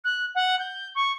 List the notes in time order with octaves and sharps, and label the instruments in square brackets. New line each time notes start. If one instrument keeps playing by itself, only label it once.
[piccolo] F#6
F#5
G6
C#6